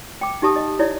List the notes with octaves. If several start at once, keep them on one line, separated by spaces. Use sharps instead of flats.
G5 D6
D#4 G4 E5 A5 D#6
D#5
E4 C#5 D5 E5